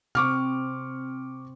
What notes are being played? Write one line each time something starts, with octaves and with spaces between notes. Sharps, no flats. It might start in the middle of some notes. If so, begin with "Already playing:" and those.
C3 C4 C#6 D6 F6